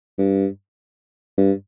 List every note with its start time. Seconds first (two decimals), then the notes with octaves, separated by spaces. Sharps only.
0.18 G2
1.38 G2